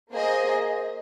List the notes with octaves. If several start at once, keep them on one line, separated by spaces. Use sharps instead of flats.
A#3 G#4 C5 D#5